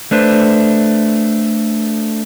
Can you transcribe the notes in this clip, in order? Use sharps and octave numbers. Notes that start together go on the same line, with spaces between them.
A3 D4 B4 C5